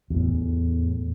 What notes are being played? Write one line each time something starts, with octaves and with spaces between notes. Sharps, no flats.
E2 A2